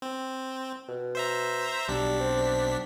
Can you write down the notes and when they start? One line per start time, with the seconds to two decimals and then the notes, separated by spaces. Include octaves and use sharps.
0.02 C4
0.88 B2
1.15 C5 E5 A#5
1.88 B1 G3 D4 B6
2.20 C4